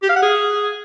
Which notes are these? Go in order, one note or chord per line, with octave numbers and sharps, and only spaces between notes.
G4
F5
F#5
G#4